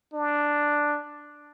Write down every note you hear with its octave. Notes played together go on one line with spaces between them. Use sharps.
D4